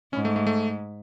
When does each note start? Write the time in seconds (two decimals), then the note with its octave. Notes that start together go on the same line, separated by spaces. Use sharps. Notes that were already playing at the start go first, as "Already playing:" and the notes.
0.13 G#2 C#4
0.25 A3
0.36 A3
0.47 A3